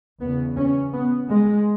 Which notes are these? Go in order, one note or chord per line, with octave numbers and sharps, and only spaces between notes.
E2 C#3 B3
C#4
B3
G#3